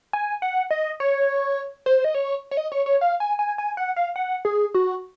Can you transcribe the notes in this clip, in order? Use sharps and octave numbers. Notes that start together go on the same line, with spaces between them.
G#5
F#5
D#5
C#5
C5
D#5
C#5
C#5
D#5
C#5
C#5
F5
G#5
G#5
G#5
F#5
F5
F#5
G#4
F#4